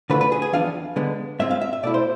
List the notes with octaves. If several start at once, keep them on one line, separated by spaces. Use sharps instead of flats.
D3 A3 D4 F4 B4
B4
G#4
G#4
F2 E3 B3 D4 F4 F5
D3 G#3 B3
G#2 G#3 C4 F4 E5
F5
E5
E5
B2 A3 E4 D5
C5